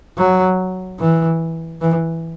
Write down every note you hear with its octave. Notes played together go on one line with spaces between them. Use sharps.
F#3
E3
E3